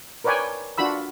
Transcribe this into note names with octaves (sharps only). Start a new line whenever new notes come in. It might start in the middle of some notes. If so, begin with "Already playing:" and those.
A#4 B4 C#5 D5 G5 G#5
D4 F4 F#4 B5 E6